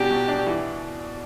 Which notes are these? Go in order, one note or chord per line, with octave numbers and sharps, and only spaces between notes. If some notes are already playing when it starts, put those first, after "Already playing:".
Already playing: E2 B2 D4 G4
B2
D4
E3